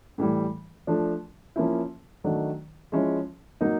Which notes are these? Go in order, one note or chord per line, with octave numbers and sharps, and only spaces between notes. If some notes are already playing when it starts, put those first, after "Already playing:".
A2 E3 G3
F3 A3 D4
F3 A#3 C#4 E4
D#3 F#3 A3 D4
F3 G#3 C#4 E4
F#3 A#3 D#4